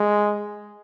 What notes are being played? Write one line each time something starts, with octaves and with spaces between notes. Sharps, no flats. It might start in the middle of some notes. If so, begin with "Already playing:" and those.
Already playing: G#3